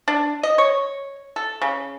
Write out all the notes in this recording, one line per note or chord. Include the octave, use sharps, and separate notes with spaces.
D4
D#5
C#5
A4
C#3